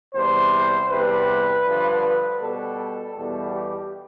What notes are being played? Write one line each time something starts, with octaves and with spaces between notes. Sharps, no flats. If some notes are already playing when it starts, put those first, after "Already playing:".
E2 C3 G3 C5
E2 C3 G3 B4
G2 D3 F3
B4
B2 G3 A4
E2 B2 G3 A4
G4